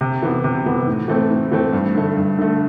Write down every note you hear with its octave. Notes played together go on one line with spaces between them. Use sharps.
C3
E3 B3
C3
E3 B3
A2
E3 A3 C4
A2
E3 A3 C4
G2
D3 A3
G2
D3 A3